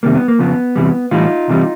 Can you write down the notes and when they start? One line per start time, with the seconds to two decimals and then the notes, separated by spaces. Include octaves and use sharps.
0.03 F2 C3 D#3 G3 A#3
0.15 B3
0.28 A#3
0.39 F2 C#3 F3 B3
0.76 E2 C3 E3 G3
1.11 A2 E3 G3 D#4 F4
1.48 C2 C3 E3 G3